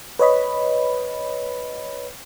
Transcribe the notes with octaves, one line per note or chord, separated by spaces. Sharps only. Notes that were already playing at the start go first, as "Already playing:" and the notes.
B4 C#5 D#5 B5